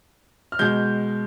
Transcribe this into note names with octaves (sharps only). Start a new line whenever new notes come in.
F6
B2 G#3 G6